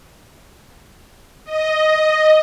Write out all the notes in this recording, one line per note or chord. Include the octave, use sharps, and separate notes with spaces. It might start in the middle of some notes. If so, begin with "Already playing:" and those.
D#5